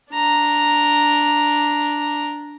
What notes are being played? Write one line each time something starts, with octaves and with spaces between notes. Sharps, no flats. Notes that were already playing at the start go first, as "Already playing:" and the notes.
D4 A#5